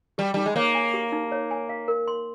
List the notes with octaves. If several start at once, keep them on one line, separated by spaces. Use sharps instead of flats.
G3 G4
G3 D#4
G#3
A#3 C#5
G#5
G4
D#4
C#5
G#5
F5
A#4
C6